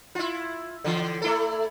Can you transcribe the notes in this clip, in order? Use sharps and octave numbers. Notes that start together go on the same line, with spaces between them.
E4 F4
D3 E3
A3 E4 A4